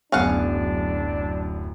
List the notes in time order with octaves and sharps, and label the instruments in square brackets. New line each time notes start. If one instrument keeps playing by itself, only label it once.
[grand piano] D1 F#2 B3 [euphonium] D4 [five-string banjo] G#4 F5 F#5